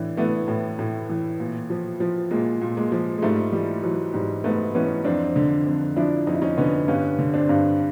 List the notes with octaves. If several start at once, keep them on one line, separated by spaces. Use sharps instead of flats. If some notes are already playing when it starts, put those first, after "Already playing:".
Already playing: A2 E3 D4
E3 A3 B3
A2
A2
E3
A#2
F3
F3
A#2 G#3 A#3
A#2
G#3 A#3
F3
G#3
G#2 G3 A3
E3 G3
E3 F#3
G#2 G3
G#2 A3 B3
E3 B3 C#4
F2 C4 D4
D3
F2
F3 D4 E4
F2 D#4
E4
C#4 D#4
D3 B3 C#4
G2 B3 C#4
D3
C4 D4
G2